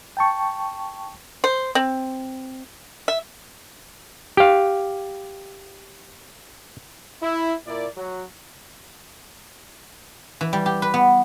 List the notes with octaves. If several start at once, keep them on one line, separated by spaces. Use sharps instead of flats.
G5 A5 C#6
C5
C4
E5
G4 F5
E4
A#2 E4 A#4 D5
F#3
E3
G3
G4
B4
B3